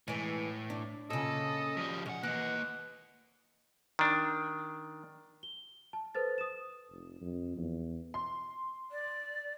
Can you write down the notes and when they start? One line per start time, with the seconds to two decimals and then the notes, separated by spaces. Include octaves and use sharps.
0.08 A2 E3 G#3
0.70 D4
1.10 A#2 C#3 A4 D#5
1.77 F3 G3
2.06 B1 G#3 F#5
2.23 E3 A#3 D#5 F#5
3.99 D#3 D4
5.43 G7
5.93 A5
6.15 A4 B4 C5 A6
6.38 D#6 E7
6.91 F1
7.21 F2
7.57 E2
8.14 C6
8.92 D5